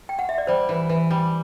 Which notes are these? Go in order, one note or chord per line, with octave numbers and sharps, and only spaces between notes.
G5
F#5
E5
D5
G3 C5
E3
E3
G3